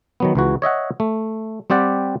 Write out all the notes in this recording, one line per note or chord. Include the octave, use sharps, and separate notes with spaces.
D#3 F#3 B3
C#2 E3 F#4
C#5 D#5 E5 F#5
A3
G3 C4 G4 D5 F#5